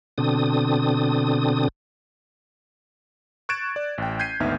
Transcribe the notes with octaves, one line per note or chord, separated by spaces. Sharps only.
B2 D3 C4 D4 D#6
C#6 F#6 G#6 A6 D7 E7
D5
A1 G5
G6 G#6 B6 C7 D#7
G#1 D2 B3 D#4 E5 F6